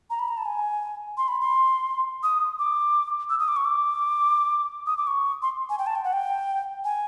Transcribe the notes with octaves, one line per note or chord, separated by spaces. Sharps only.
A#5
B5
A#5
A5
G#5
C6
B5
C6
D#6
D6
E6
D#6
D6
C#6
D6
D#6
D6
C#6
C6
G#5
G5
A5
G5
F#5
G5
G#5